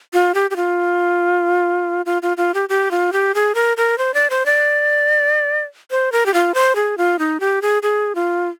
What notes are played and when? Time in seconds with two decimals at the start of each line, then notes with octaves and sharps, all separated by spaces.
0.13 F4
0.34 G4
0.51 G4
0.56 F4
2.06 F4
2.22 F4
2.37 F4
2.54 G4
2.69 G4
2.91 F4
3.13 G4
3.35 G#4
3.55 A#4
3.77 A#4
3.98 C5
4.14 D5
4.30 C5
4.46 D5
5.91 C5
6.12 A#4
6.26 G4
6.34 F4
6.54 C5
6.75 G#4
6.98 F4
7.19 D#4
7.40 G4
7.62 G#4
7.83 G#4
8.15 F4